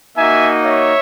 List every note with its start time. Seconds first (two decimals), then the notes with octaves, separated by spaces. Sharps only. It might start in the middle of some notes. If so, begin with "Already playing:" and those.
0.18 A#3 D#4 F#4 E5 G#5
0.65 C#5 E5